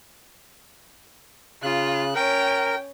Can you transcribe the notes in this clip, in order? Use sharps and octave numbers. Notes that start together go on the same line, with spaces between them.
C#3 F4 F#6
C#4 A#4 G5